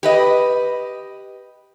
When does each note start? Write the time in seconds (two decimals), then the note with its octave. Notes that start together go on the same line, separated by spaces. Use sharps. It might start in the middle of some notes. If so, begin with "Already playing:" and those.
0.03 G4 B4 D#5